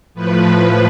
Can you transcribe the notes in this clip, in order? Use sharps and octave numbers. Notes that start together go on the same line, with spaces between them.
A2 F3 B4